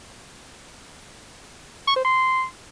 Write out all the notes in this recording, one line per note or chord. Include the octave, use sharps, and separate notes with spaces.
C#6
C5
C6